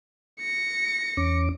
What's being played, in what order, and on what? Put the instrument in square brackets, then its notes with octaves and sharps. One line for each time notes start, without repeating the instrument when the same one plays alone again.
[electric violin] A#6 C#7
[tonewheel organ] E2 C#4 D6